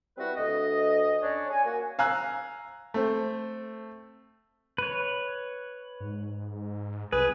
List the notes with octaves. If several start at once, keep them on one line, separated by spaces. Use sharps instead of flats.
G3 C4 E4 F#4 B4
D2 D#5
C#4 D4 C#5
G#5
A#3 F#4
F5 G#5 A#5 E6 F#6
A3 C4
B4 C#5
G#2
C2 G#4 B4